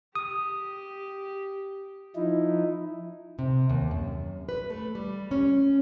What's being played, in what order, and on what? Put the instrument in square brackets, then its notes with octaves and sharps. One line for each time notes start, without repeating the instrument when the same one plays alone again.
[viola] G4 [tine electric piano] D#6
[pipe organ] F3 D#4 E4
[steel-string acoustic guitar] C3
D#2
F#2
B4
A3
G3
C#4